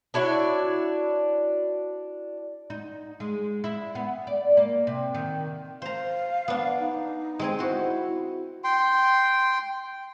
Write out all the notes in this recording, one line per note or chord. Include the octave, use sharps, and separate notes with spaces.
D4 E4 F#4 C#5
D#4
G#3
E4
B3
D5
A#3
C3
D#3
C5 F5 A#5
B3 D4
D#4
G#3 C4 G#5
E4 F#4 C5
G5 C6